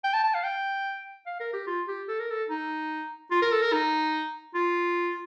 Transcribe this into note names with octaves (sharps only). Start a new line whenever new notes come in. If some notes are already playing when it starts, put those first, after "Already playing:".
G5
A5
A5
F5
G5
F5
A#4
G4
F4
G4
A4
A#4
A4
D#4
F4
A#4
A4
A#4
D#4
F4